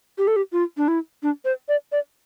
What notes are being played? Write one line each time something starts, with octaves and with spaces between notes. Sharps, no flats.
G4
A4
G4
F4
D4
E4
D4
C5
D5
D5